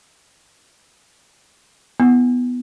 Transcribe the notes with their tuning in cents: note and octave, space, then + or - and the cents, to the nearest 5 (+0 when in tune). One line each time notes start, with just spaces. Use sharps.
B3 +0 E4 +0